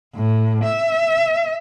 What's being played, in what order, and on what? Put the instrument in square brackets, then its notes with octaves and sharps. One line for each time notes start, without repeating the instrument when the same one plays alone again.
[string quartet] A2
E5